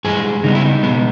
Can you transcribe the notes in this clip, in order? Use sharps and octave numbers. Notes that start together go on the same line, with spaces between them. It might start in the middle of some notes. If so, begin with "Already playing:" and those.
G2 E3 G#3 G#4
C#3 G3 B3 D#4
E4
D#4
B2 G#3 B3